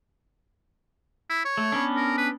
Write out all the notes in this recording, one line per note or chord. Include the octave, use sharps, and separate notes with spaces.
E4
C#5
A3
B3 C#4 D4
A#4
B4